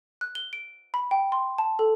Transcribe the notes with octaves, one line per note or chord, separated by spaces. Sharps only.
F#6
G7
D7
B5
G5
C6
A5
A4